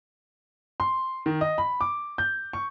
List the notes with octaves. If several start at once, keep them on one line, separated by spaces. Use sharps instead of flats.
C6
D#3
D#5
B5
D6
G6
C#6